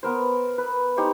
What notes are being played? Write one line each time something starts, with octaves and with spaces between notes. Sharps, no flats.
B3 A#4 C5
B4
D#4 G4 C5 C#6